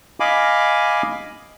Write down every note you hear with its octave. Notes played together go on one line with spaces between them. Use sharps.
D#5 F5 G#5 B5 D6